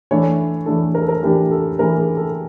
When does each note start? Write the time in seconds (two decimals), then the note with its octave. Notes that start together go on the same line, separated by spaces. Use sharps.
0.11 E3 A3 D4 C#5
0.66 E3 A3 D4 A4
0.95 A#4
1.02 A4
1.08 A#4
1.23 E3 A3 D4 G4
1.51 A4
1.78 E3 A3 D4 A#4
1.98 G#4
2.17 A4